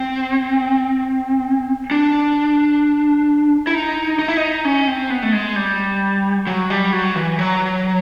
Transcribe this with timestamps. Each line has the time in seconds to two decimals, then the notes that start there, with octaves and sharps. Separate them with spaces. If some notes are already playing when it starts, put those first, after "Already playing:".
Already playing: C4
1.91 D4
3.67 E4
3.74 D#4
4.19 D#4
4.28 E4
4.37 D#4
4.65 C#4
4.88 C4
5.10 B3
5.22 A3
5.33 G#3
5.56 G3
6.47 F#3
6.70 G3
6.93 F#3
7.16 E3
7.39 F#3